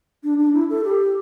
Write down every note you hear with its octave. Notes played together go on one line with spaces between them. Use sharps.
D4
D4
E4
A4
G4